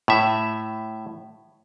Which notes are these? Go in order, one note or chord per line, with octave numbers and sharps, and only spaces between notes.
A2 E5